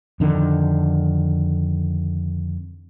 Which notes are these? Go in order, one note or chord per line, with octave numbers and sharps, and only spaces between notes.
F2 D3 D#3